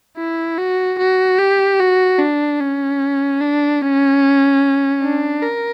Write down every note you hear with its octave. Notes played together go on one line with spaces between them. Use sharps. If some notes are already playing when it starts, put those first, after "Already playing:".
E4
F#4
F#4
G4
F#4
D4
C#4
D4
C#4
D4
A#4